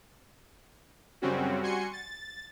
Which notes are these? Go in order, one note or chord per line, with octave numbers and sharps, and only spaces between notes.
F#2 C#3 G3 C4 C#4 F#4
G3 F#4 G#5 C6 C#7
A6